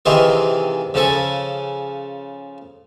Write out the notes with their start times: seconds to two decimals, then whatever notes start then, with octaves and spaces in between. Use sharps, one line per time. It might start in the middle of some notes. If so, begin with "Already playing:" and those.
0.06 C3 D#3 E3 F4 G#4
0.94 C#3 F3 A4 G#5